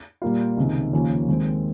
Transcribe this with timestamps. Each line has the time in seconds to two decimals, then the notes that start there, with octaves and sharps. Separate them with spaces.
0.22 A#2 G3 A#3 F4
0.57 C#2 C3 D#3
0.93 D#2 C#3 F3 A#3 C#4
1.28 D#2 D#3 G#3 C4